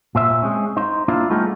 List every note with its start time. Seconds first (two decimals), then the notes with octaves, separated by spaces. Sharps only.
0.15 A#2 C5 E5
0.42 G#3 C4 C#4
0.77 D#4 C5
1.08 A#3 D4 E4 F4 C5
1.30 G3 A3 B3 D#4 F4 G#4